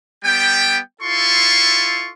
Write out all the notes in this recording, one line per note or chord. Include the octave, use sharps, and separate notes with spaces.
G3 B3 G5
E4 F4 A4 C6 C#6